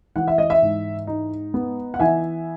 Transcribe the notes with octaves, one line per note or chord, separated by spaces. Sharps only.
E3 F#5
E5
D#5
E5
G#2
D#4
B3
F#5
E3 E5 G#5